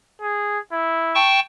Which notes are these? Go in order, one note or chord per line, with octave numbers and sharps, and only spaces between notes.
G#4
E4
G5 A5 C#6